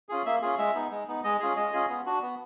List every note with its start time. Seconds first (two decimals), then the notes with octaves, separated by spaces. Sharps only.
0.09 C#4 F4 G#4
0.25 A#3 E5
0.42 C#4 F4 G#4
0.58 G#3 E5
0.74 B3 D#4
0.91 G#3
1.07 B3 D#4
1.24 G#3 D#5
1.40 C#4 F4 G#4
1.56 G#3 D#5
1.73 C#4 F4 G#4
1.89 B3
2.06 D4 F#4
2.22 B3